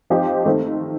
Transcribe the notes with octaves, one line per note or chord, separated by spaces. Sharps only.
F3 C4 D#4 G4 C5
D#3 A3 C4